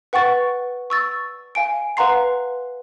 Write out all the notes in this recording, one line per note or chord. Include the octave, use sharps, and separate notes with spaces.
B4 F#5 G5 C#6 A6
C#6 E6 A6
F5 G#5 D7
B4 F5 F#5 A#5 C6 C7